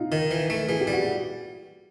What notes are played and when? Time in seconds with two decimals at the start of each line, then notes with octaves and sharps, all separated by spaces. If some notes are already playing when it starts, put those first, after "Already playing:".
Already playing: D#4 F4
0.12 D#3
0.31 E3
0.50 A3
0.69 E3 G#4
0.81 G4
0.87 G3
0.93 F#4